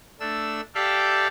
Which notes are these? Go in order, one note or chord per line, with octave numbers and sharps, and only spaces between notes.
A3 D4 E6
G4 A4 D5 E5 F5 G5